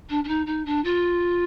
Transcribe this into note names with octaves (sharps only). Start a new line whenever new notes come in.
D4
D4
D#4
D#4
D4
F4